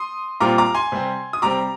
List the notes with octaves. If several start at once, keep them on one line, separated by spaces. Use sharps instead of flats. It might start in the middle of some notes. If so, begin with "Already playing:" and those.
Already playing: C6 D#6
A#2 G3 C4 F4 A#5 D6
A#5 D6
G#5 C6
C3 G3 C4
D#6
C3 G3 C4 A#5 D6